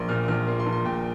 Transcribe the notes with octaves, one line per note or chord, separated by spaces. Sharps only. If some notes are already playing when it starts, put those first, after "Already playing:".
Already playing: A#1 A#3 C6
A#2 F6
A#1 F6
A#3 C6
C6
A#1
C6
A#2 G5